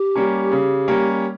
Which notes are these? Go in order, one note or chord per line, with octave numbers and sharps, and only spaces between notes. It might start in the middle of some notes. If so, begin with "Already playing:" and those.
Already playing: G4
G3 A#3 C#4
C#3
G3 A#3 C#4